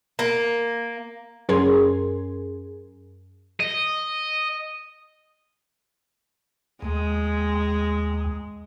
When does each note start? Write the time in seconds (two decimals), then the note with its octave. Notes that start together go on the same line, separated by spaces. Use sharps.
0.19 A#3
1.49 F#2 C#4 G#4 A#4 C6 G#6
3.60 D#5
6.82 D#2 G#3